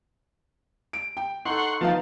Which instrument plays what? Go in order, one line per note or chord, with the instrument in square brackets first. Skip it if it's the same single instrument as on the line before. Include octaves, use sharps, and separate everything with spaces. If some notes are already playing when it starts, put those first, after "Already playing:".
[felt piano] D7
G5
[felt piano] D#4 A4 [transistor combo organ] F#5 C6 C#6
[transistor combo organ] F3 A5 [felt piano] B3 D#4 F5